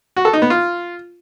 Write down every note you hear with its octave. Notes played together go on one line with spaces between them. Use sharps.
F#4
A4
D#4
B3
F4